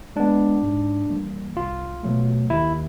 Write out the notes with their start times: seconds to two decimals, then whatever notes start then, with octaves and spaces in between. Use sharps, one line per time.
0.16 G#3 B3 D4
0.63 G#2
1.10 E3 G3 A#3
1.56 C2 F4
2.03 B2 F#3 A3
2.50 D#2 E4